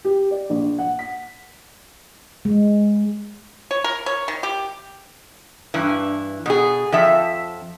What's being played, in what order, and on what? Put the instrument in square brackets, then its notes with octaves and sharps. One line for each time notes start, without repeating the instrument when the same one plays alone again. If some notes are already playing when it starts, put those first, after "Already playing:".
[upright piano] G4
D5
A#1
F#5
B6
[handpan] G#3
[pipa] C#5
A#4
C#5
D#3
G4
[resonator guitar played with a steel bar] G2 E3
B2 G#4
F2 F3 E5